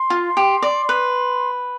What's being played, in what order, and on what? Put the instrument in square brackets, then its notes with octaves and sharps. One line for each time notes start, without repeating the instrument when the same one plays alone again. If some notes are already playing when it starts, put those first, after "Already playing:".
Already playing: [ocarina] C6
[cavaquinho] F4
G4
D5
B4